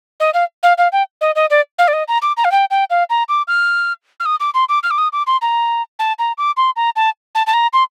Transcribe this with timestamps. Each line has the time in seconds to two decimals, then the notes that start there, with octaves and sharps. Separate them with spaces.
0.20 D#5
0.34 F5
0.63 F5
0.78 F5
0.92 G5
1.21 D#5
1.36 D#5
1.50 D5
1.79 F5
1.88 D5
1.93 D#5
2.08 A#5
2.22 D6
2.37 A#5
2.45 F5
2.52 G5
2.71 G5
2.90 F5
3.10 A#5
3.29 D6
3.48 F6
4.20 F6
4.26 D#6
4.40 D6
4.54 C6
4.69 D6
4.83 F6
4.91 D6
4.98 D#6
5.13 D6
5.27 C6
5.42 A#5
5.99 A5
6.19 A#5
6.38 D6
6.57 C6
6.76 A#5
6.96 A5
7.35 A5
7.47 A5
7.54 A#5
7.73 C6